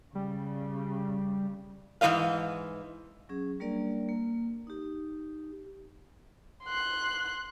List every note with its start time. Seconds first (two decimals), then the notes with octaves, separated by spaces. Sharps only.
0.15 C#3 G3
2.01 G#2 E3 F3 B3 D#5 F5
3.29 F#3 C#4 G#4
3.60 G3 A#3 D4 A#4 D5
4.09 A#3
4.67 D#4 G4
6.64 C6 F#6